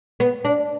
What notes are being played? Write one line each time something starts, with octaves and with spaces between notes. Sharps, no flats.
B3
D4